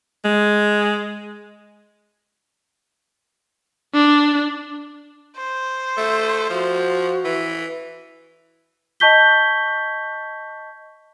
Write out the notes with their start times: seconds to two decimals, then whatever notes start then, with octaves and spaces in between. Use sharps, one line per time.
0.25 G#3
3.95 D4
5.36 C5
5.98 A3
6.50 F3 F#4
7.25 E3
9.00 D#5 A5 C#6 G6 B6 G7